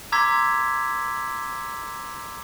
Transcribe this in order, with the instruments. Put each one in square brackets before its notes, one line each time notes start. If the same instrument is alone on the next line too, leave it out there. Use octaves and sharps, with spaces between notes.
[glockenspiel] A#5 C6 D6 E6 G#6 B6